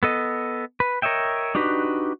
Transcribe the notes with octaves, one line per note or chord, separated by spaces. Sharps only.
B3 A4 D#5
B4
A#4 C#5 D#5 E5 G5
D4 D#4 F#4 G4 B4